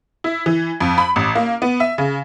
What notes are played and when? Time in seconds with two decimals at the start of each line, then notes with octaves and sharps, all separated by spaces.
0.24 E4
0.46 E3
0.80 F2
0.98 B5
1.16 A1
1.35 A#3
1.62 B3
1.80 E5
1.98 C#3